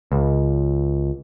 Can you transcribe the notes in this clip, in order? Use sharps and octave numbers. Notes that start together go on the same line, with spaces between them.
C#2